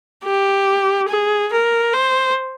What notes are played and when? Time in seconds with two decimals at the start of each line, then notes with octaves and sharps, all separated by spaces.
0.25 G4
1.09 G#4
1.52 A#4
1.93 C5